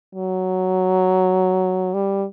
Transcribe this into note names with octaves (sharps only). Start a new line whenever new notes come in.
F#3
G3